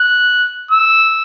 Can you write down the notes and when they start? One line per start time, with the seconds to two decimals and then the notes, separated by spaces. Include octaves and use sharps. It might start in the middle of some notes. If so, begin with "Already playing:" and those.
Already playing: F#6
0.71 E6